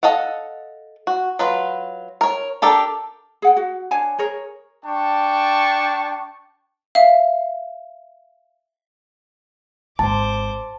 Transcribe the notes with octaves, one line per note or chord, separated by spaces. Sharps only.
A4 D#5 F5 F#5
F#4
F#3 F4 B4
A#4 C#5
D4 G4 A4 A#4
G#4 F#5 G5
F#4
D4 C#5 G#5 A5
G#4 A#4 C#5
D4 G5 A5 C#6
E5 F5
G#1 C5 A5 D6